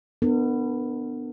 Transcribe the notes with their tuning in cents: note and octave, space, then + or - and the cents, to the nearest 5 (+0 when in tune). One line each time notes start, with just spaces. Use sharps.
B3 +0 D4 +20 A#4 -40